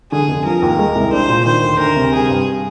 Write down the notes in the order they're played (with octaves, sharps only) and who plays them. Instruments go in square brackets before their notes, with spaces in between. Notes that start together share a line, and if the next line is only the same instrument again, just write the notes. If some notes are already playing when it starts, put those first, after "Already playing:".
[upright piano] D3 [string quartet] G#4
[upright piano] F1
[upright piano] F3 [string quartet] A#4
[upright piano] D#2
G#3
C2
[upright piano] D4 [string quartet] C5
[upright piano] A#2
[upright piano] D#3 [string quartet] C5
[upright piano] D2
[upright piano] D2 [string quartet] A#4
[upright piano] C3
[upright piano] G3 [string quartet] G#4
[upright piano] G2